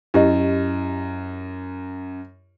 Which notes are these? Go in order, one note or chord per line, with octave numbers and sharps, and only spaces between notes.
F#2 E4 G4 D#5